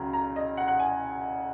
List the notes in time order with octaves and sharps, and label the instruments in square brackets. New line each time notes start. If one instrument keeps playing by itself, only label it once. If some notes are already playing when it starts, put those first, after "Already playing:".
Already playing: [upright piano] C#2 C#3 F#3 A#5
A#5
D#5
F#5
F#5
G#5